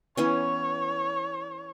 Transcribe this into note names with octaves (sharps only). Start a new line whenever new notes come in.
E3 B3 C#4 C#5